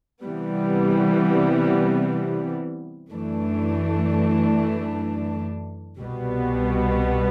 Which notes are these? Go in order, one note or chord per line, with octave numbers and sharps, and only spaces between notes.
C3 E3 G3 B3
F#2 E3 A3 D4
C2 B2 G3 B3